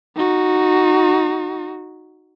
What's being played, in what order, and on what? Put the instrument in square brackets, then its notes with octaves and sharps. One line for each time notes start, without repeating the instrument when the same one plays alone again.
[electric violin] D#4 F#4